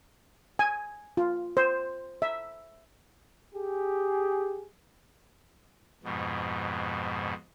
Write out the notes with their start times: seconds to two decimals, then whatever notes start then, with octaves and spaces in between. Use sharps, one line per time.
0.59 G#5
1.17 F4
1.57 C5
2.22 E5
3.55 G4 G#4
6.03 F2 G#2 B2